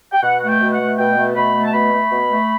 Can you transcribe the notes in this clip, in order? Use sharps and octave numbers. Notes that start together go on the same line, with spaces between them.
G5
B2 F#5
A3 F#5
G5
B2
F#5
A3
B2 G5
A3
B2 B5
A3
A5
B2 B5
A3
B2
A3